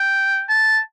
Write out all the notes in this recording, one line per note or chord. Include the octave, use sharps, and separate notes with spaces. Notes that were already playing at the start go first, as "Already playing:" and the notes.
Already playing: G5
A5